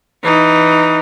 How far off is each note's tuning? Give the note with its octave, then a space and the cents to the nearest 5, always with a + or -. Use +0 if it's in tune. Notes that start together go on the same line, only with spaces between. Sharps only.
E3 +0 D#4 +0